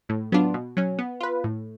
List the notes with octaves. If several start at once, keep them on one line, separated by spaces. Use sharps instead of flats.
A2
F#3 B3 D4 F4
B2
F#3 C#4
B3
F4 B4
A2